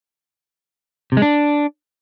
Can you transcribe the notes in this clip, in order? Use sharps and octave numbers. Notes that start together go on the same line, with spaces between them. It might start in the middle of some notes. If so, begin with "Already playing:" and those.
C3
G#3
D4